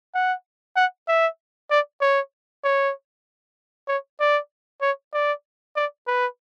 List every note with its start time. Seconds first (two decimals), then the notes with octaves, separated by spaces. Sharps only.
0.15 F#5
0.76 F#5
1.08 E5
1.70 D5
2.01 C#5
2.64 C#5
3.88 C#5
4.20 D5
4.82 C#5
5.14 D5
5.76 D5
6.07 B4